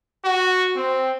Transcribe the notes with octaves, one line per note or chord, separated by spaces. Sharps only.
F#4
C4